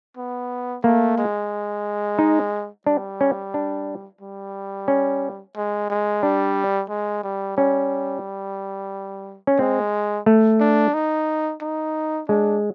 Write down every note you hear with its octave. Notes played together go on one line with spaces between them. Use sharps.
B3
A3 A#3
G#3
D#4
G3 D4
C#4
D4
G3
C#4
G#3
G#3
G3 D4
G#3
G3
G3 C#4
C#4
G#3 C4
A3
D4
D#4
D#4
G#3 D4